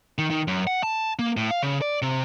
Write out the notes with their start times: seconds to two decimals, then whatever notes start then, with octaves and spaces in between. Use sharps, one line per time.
0.18 D#3
0.30 D#3
0.48 F#2
0.67 F#5
0.83 A5
1.19 A#3
1.37 A2
1.51 F5
1.63 C#3
1.82 D5
2.02 C3